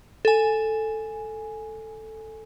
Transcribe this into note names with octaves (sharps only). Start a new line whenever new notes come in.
A4 G#5